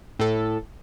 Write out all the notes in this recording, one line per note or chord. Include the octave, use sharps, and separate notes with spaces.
A2 A4